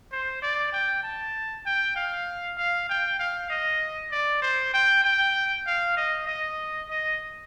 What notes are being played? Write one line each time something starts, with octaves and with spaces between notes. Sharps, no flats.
C5
D5
G5
A5
G5
F5
F5
G5
F5
D#5
D5
C5
G5
G5
F5
D#5
D#5
D#5